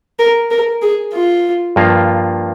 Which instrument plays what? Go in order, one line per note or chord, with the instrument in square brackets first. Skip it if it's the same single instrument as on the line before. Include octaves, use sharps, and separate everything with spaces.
[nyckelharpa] A#4
A#4
G#4
F4
[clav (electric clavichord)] G2 F3 A#3 F4